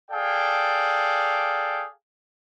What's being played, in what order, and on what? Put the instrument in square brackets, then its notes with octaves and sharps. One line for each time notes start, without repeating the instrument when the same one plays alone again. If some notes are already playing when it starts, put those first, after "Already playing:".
[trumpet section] G#4 A4 D5 F5 G5